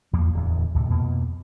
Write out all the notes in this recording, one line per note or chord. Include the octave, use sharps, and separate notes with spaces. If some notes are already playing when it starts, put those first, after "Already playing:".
E2 F3 A#3
D1 E2
D2 A2 C3
F2 B2 A#3